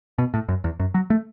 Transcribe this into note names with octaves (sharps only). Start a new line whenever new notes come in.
B2
A2
F#2
E2
F#2
F#3
A3